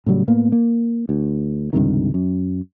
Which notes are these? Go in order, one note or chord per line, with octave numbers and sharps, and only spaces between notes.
A2 C#3 F#3 G3
A2 A#3 B3
A#3
D2
C#2 G2 C3 D#3
F#2